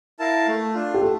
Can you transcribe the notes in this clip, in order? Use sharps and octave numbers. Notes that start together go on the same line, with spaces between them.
E4 A#4 F5 A5
A3
D4 F4
G4
A3 A4